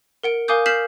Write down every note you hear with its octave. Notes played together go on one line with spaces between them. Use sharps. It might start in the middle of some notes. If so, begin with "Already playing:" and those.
A#4 F#5 D7
A#4 F5 G#5 D6 D#6 G6
F6 G6 B6 C7 E7 F#7